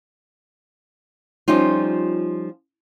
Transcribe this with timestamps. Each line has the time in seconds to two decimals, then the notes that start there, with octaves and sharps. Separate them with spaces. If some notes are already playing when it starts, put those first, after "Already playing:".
1.48 F3 G3 C#4 D#4 F4